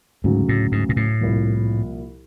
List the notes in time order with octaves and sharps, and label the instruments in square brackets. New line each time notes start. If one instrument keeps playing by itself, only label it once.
[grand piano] D2 C#3 F#3 [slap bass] G#2
[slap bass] A2
G#2
A#2
A2
[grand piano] C2 A#2 F3